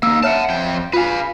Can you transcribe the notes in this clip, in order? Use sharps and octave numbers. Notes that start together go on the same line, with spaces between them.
A#3 D#4 E6
C#5 E5 F#5 A5 F6
F2 G5
F4 B4 F5 G#5